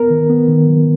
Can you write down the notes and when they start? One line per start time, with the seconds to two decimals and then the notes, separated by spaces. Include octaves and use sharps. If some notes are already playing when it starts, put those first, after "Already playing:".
Already playing: B3 A#4
0.10 D#3
0.30 B3
0.49 D#3
0.68 F#3